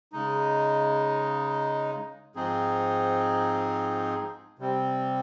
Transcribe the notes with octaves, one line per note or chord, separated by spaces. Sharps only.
C#3 G#3 D#4
G#2 F3 C4 D#4 G#4
C3 G3 C4